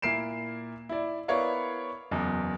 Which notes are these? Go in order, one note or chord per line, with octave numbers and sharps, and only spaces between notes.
A#2 E4 A#4 C7 D7 E7
E4 D5
B3 E4 A#4 C#5 D5 F5
F#1 E2